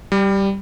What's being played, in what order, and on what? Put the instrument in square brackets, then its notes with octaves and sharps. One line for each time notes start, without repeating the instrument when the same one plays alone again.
[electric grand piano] G3